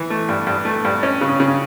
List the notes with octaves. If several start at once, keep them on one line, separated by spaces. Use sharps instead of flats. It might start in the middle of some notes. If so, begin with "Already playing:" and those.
Already playing: E3
A3
G2
G2
A3
G2
C#4
C#3
C#3